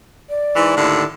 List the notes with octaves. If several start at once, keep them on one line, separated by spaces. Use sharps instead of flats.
D5
G#2 E3
D#2 A2 D3